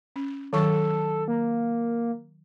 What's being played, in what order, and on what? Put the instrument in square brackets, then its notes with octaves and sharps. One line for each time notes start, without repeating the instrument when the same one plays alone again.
[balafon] C#4
[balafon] D#3 F#3 C#6 [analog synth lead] A4
[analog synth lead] A#3